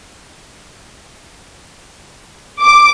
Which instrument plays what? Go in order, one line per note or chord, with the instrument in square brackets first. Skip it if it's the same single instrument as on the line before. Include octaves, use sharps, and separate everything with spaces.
[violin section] D6